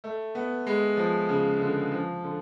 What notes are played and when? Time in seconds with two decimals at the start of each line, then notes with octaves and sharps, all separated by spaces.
0.04 A3
0.35 B3
0.66 G#3
0.97 F3
1.29 C#3
1.60 D3
1.92 F3
2.24 D3